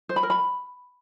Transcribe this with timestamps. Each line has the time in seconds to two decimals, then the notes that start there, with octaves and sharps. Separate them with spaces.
0.09 C5
0.16 B5
0.23 A#4
0.30 B5